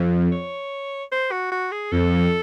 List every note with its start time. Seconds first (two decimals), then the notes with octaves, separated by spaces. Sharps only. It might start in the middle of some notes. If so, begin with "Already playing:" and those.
Already playing: F2
0.32 C#5
1.12 C5
1.32 F#4
1.52 F#4
1.72 G#4
1.92 F2 A4